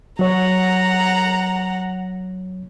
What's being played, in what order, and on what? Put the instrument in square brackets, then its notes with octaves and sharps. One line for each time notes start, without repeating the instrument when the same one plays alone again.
[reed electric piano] F#3 C#5 [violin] F#5 A#5